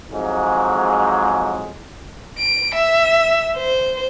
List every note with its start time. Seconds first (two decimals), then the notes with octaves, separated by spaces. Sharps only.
0.12 F2 G#2 F#3 G#3
2.38 D7
2.75 E5
3.57 C5